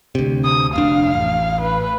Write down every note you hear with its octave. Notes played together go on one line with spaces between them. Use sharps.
D2 C3
D#6
F1 D4 F5
A1
B4